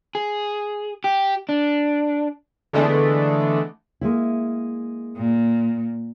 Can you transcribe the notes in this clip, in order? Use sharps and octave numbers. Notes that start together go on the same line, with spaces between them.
G#4
G4
D4
D3 E3 G#3 A3 B3 D4
G#3 A#3 E4
A#2